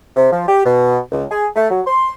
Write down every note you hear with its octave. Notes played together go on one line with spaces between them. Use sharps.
C3
F3
G4
B2
C#2
G#4
A3
F#3
C6